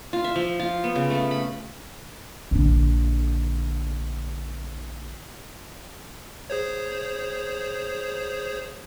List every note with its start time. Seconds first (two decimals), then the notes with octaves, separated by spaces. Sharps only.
0.13 F4
0.24 E5
0.36 F3
0.60 F4
0.84 B3
0.96 C#3
1.10 A3
1.31 B5
2.51 A#1 D3
6.50 G#4 C5 C#5